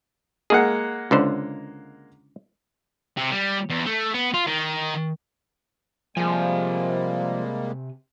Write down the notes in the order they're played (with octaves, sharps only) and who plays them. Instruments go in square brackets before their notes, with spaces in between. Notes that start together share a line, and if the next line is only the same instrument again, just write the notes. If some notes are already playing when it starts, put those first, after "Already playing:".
[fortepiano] G#3 A#3 F#5 [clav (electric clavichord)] G#4
[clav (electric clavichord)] C#2 D3 C5
[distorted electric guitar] C3
G3
E2
A3
B3
F4
D#3
[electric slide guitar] C3 G#5 [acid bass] F3 [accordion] G3 G#3 A#3